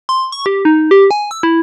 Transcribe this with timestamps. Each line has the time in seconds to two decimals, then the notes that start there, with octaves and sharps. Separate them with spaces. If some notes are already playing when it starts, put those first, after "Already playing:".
0.09 C6
0.32 C#6
0.46 G4
0.65 D#4
0.91 G4
1.11 G#5
1.31 E6
1.43 E4